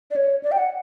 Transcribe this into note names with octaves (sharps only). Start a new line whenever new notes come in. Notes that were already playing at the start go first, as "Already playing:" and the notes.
D5
C#5
D5
G5
F#5